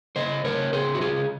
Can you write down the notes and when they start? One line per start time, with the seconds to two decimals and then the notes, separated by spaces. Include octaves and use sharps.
0.16 C#3 C5 D#5
0.44 C#3 A#4 C#5
0.73 C#3 G#4 C5
0.95 F#4
1.00 C#3 F4 G#4